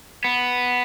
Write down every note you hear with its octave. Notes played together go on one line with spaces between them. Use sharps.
B3